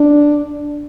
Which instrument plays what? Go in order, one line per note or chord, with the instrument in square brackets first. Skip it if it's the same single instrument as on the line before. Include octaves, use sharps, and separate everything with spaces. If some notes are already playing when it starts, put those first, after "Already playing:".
Already playing: [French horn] D4